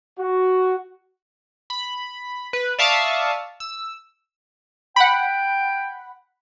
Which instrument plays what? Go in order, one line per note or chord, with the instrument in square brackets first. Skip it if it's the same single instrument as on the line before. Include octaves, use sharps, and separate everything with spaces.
[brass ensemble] F#4
[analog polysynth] B5
B4
D5 E5 F5 A5 C#6 D#6
E6
[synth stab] F#5 B5 [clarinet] G5